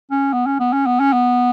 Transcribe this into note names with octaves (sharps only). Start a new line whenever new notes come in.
C#4
B3
C#4
B3
C#4
B3
C#4
B3